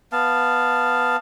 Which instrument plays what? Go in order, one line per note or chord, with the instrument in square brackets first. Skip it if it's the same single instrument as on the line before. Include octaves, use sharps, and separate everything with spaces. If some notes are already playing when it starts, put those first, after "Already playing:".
[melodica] B3 F5 A5